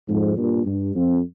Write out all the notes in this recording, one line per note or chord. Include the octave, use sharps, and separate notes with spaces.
F2 G#2
G2 A#2
G2
F2